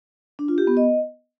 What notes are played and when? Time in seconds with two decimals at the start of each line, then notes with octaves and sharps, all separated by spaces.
0.39 D4
0.48 F4
0.58 G4
0.67 B3
0.77 D#5